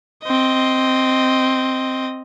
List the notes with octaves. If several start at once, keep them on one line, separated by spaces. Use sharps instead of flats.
C4 D#5